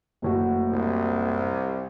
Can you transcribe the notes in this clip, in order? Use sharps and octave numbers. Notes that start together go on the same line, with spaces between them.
F#1 A2 F#4
C2